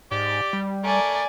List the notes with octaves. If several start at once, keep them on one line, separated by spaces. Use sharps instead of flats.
G#2 G4 D5
G3
A3 A#4 D5 G#5